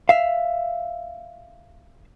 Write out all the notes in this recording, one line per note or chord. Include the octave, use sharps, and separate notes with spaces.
E5 F5